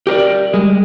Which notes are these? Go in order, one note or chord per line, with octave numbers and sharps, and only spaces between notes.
G4 A#4 C5 D5
G3 G#3